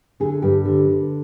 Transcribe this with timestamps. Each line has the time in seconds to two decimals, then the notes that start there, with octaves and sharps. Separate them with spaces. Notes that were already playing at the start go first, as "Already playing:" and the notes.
0.20 D3 G#4
0.42 G2 G4
0.65 D3
0.89 D3